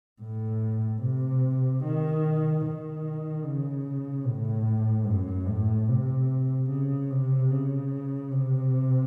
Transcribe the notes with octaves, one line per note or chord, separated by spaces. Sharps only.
A2
C3
D#3
D#3
C#3
A2
F#2
A2
C3
C#3
C3
C#3
C3